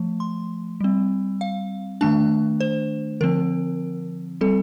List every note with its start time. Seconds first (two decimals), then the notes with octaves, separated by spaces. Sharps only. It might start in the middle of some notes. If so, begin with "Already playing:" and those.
Already playing: F3 A3
0.20 C6
0.81 G3 C4
1.41 F5
2.01 D#3 A3 D4 A5
2.60 C5
3.21 D3 F3 C4 A#4
4.41 G3 C4 A4